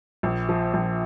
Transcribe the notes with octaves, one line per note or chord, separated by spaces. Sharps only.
A#1
F3
A#1